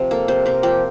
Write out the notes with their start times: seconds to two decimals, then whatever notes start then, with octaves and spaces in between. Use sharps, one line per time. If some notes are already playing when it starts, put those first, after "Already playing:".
Already playing: C3 F3
0.11 A#3 A4
0.28 C3 C5
0.46 C3 A#4
0.63 F3 G4